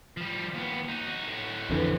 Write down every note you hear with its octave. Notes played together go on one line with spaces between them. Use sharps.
F3 G3
D#2 B3
D#4 F#4
A2 F#4
F2 D3 E3